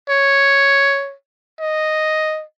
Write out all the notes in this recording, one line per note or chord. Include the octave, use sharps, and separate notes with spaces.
C#5
D#5